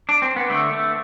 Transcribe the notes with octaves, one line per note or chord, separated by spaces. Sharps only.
D4
C4
B3
D3 A3
A3